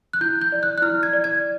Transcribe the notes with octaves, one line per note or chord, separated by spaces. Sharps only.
F#6
E4 G6
G6
D5
F#6
F#6
E4 F6
G#6
D5
G#6